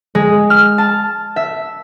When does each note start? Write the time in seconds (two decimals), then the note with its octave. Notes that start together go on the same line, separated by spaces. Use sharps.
0.15 G#3
0.50 F6
0.78 A5
1.36 E5